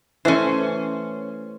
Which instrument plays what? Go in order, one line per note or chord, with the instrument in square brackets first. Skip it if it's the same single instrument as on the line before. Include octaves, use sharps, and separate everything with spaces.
[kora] E3 A3 [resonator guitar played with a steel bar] C#4 C5